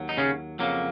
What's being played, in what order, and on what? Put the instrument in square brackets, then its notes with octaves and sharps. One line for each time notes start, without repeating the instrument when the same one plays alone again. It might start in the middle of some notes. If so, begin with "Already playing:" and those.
Already playing: [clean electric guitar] D#2 F#3
D#4
C#3 C#4
F2 C#3 F#3 A#3